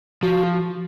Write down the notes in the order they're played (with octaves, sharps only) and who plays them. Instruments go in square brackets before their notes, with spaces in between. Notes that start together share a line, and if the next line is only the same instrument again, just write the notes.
[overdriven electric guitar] F3 [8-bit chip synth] F#4